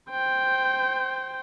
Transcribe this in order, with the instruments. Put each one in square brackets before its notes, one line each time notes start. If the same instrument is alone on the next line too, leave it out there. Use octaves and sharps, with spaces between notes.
[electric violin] C5 G5